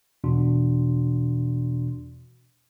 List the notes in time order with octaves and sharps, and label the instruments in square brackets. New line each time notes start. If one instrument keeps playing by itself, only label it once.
[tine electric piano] E2 B2 E3 D4 F#4 C6